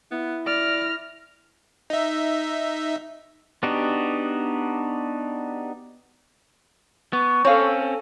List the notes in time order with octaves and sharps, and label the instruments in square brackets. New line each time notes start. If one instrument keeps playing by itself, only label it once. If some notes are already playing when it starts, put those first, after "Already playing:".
[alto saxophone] B3 [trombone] E4
[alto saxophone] D5 [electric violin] F6 A#6
[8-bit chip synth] D#4 E5
[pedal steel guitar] B3 D4 D#4 F#4 G4
[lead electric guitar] B3 [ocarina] C#6
[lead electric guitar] C4 C#4 [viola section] A4 [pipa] C#5 F5